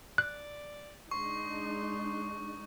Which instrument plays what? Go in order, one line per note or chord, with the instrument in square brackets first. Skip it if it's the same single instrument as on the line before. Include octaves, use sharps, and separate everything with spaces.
[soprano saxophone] D5 [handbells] F#6
[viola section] G#3 D4 D#4 [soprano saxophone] C6 [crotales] C#6